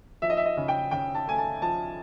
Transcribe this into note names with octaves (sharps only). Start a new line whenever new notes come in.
F3 E5
D#5
E5
D#5
C#3
G5
C#3 G5
A5
A3 G#5
A5
F3 A5